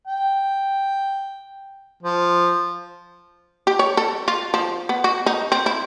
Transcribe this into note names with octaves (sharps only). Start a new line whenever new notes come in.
G5
F3
G4
C#5
A4
F4
F3
B3
F#4
D#4
C4
E4